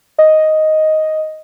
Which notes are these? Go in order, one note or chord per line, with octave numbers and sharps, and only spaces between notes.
D#5